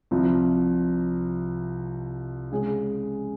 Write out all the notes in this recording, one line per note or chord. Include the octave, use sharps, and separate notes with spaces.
C2 C3 F3
C#3 G#3 C#4 G#4